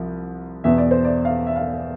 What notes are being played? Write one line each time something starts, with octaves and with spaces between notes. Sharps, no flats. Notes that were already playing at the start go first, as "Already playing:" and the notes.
Already playing: C2 F3
E2 B2 E5
D5
C5
D5
F5
E5
F5